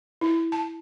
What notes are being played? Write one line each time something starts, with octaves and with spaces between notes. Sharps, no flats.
E4
A5